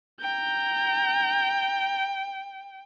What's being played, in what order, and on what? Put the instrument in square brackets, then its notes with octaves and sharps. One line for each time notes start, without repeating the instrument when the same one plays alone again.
[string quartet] G5 [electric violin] A#5 G6